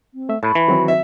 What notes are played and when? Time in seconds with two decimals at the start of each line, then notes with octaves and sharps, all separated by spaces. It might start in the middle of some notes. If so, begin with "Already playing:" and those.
0.14 C4
0.29 A3 E5
0.43 A2 A5 B5 C#6
0.55 E3
0.68 D#3 F#3 C4 F#4
0.88 E5